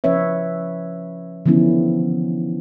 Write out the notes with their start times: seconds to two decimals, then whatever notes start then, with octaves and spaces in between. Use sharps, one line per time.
0.04 F3 C#4 B4 C#5 E5
1.46 D3 E3 F3 B3 C#4 E4